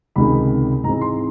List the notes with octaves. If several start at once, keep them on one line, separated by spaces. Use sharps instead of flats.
C#2 C3 D#3 G#3 B5
G#2 E3 G#3 C4 A#5
C6